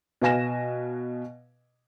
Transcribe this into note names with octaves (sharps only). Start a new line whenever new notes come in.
B2 B4 F5 G#5 A#6 E7